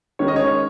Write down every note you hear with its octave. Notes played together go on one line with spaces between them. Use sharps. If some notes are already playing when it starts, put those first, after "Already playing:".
D#3 G#3 C#4 C#5
D#5
C#5